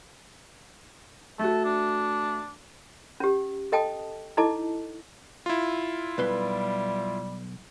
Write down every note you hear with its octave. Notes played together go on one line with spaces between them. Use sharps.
A3 F#4 A4
D4
C#4 G4
A4 D#5 G5 A5 D#6
D#4 E4 A4 D#5 A5 D6
E4 F4
B1 G3 B4 C6